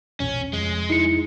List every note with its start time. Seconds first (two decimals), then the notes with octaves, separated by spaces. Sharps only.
0.20 E1 A#1 C#4
0.53 F1 F2 G#3
0.90 D#4 E4 C#7